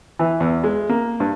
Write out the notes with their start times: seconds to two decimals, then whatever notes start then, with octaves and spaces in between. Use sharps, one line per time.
0.19 E3
0.40 E2
0.64 G#3
0.89 A#3
1.20 G2